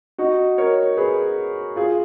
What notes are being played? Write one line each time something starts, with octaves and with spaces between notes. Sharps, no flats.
D#4 F#4
A#4 C#5
G#4 B4
F4 G#4